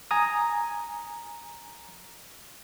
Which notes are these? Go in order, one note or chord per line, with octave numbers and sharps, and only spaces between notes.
G#5 A#5 D#6